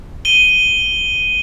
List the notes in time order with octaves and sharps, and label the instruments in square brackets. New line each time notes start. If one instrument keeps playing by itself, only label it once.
[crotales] D#7 G7